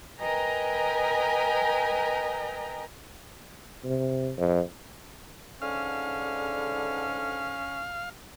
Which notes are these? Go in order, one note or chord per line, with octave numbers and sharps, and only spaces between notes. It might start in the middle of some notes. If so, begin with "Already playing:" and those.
A#4 B4 D#5 G5 G#5 A#5
C3
F2
G#2 D3 C#4 F5